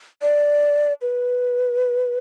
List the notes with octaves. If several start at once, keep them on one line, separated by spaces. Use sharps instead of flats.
D5
B4